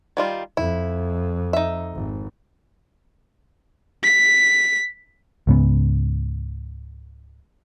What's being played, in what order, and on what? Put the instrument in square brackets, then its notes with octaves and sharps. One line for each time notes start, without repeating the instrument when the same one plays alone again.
[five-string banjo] D#3 G3 F4
[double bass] F2 [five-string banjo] E4
[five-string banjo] D#4 E5
[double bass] G#1
[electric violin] B6
[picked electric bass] C#2 G#2 C#3 B3